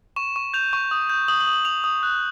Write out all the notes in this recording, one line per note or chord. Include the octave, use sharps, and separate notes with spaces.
C#6 E7
C#6
G6 F7
C#6
D#6
G6
D#6 F#7
F#7
D#6
F#7
D#6 F7
D#6
F#6